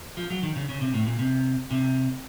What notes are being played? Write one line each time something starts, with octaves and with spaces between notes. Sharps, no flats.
F3
F#3
D#3
C#3
C#3
C3
A2
A#2
C3
C3